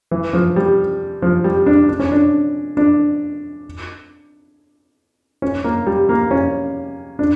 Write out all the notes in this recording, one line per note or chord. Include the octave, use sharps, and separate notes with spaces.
E3
F3
G3
F3
G3
D4
D4
C#4
D4
D4
C#4
A#3
G3
A#3
C#4
D4